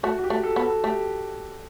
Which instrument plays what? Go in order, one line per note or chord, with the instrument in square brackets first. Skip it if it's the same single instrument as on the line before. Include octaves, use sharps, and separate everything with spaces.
[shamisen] A3 [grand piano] F#4
[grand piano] F#4
G4
[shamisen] A3
[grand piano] A4
[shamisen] B3
[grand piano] A4
[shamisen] A3 [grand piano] G4